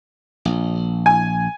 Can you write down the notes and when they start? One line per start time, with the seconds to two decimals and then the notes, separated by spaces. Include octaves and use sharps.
0.45 A#1
1.06 G#5